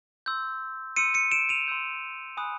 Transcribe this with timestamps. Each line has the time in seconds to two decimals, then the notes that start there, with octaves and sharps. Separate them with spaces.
0.26 C6 E6 G6
0.97 C6 E6 G6 C#7 D#7
1.14 C#7 D#7
1.31 D7 E7
1.49 D#7 F7
1.68 C6 E6 G6
2.37 G#5 B5 D#6 F#6